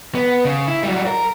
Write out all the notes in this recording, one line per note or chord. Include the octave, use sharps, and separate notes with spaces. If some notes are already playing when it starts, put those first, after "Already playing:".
B3
C#3
E4
F#3 G3
A#4